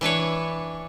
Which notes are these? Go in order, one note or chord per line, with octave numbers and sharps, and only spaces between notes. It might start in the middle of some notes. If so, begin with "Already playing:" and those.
E3 D4 B4 C#5